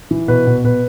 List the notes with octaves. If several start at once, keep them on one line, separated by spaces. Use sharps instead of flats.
E3
B2 B4
B2
B2 B4